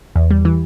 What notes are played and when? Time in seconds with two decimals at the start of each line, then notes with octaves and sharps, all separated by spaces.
0.16 E2
0.31 G3
0.45 E3